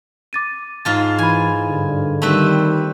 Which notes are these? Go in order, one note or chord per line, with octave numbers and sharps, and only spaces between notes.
D6 A6 D#7
G#2 F4 A5
E3 G#5 B5 G#6
G2 D3
D#3 G3 A3 C4 B4